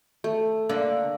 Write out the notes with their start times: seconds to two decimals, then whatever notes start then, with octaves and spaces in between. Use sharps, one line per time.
0.24 A3
0.69 D3 A#3